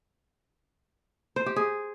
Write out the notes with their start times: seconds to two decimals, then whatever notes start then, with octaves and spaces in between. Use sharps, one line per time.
1.36 C5
1.46 G4
1.56 G#4